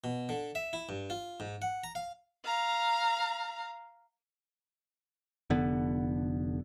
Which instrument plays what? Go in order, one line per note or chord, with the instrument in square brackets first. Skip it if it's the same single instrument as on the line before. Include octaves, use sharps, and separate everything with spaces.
[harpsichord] B2
D3
E5
E4
G2
F4
G#2
F#5
A#5
F5
[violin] F5 A#5
[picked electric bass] F1 D3 B3